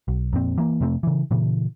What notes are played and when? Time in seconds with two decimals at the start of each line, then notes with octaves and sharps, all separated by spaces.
0.08 B1
0.33 F2 A#2 C4
0.58 E3 A#3
0.81 F2 C3 A3 C4
1.03 C#3 E3
1.31 A#2 C#3 E3